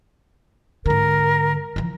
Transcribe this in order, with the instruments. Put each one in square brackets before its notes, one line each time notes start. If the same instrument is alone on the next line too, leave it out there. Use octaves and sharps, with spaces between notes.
[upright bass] G#2 D3 [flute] A#4
[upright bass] E3 F3